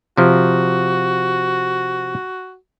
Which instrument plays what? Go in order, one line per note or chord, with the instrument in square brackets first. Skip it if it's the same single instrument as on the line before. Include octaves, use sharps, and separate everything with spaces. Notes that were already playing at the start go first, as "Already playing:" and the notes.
[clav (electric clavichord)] C3 F3 [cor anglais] F#4